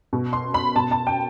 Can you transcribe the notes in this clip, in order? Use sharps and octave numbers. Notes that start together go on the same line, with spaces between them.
B2
C6
B5
B2 A5
A5
G5